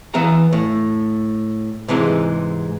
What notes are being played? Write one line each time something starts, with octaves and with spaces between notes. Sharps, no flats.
E3 B3 E5 F5 A#5
A2
G#2 C3 E3 G#3